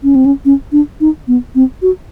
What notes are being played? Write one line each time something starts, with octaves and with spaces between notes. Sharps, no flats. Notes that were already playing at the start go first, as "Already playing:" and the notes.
C#4
C4
C#4
C#4
D4
D#4
B3
C4
F#4